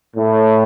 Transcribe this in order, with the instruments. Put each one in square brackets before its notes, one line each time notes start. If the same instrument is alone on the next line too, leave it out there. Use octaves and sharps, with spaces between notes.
[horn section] A2